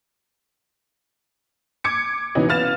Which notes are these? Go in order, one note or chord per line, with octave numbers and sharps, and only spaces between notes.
D6 G#6 C#7
B2 E3 C#4 D#4 B4
B4 F5 F6 A6 E7